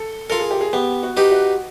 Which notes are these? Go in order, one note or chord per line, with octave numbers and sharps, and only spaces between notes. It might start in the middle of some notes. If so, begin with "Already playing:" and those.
Already playing: A4
F4 A4 A#4
G#4
G4
G#4
B3 G4
F#4
D#4 G4 B4
F#4